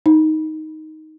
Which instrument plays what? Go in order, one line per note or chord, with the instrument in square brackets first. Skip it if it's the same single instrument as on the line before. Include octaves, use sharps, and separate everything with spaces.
[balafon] D#4